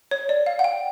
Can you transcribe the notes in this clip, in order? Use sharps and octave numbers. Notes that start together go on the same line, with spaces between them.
C#5
D5
F5
F#5
G5